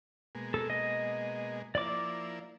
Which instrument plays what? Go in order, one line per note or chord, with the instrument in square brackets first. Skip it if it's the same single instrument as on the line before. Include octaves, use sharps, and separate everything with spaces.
[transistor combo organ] B2 G#3 A#3
[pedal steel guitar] A4
D#5
[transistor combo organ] F3 A#3 E4 [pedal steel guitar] D5 D6